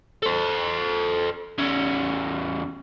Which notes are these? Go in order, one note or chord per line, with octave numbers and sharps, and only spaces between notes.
A4 C5
E2 C#4